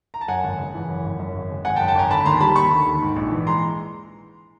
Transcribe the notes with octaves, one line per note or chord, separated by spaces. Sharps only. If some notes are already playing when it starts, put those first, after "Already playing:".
A#5
A5
F#2 F#5 G#5
G#1
C#3
E3
F#2
G#1
F#2
G#1
C#3
G#1 F#5 G#5
G5 A5
F#2
G5 A5
G#1 G#5 A#5
D3 A5 B5
D#2 A#5 C6
G3 A5 B5
D#2 B5 C#6
D3
D#2
G#2
A#1
E3
G#3 A#5 C6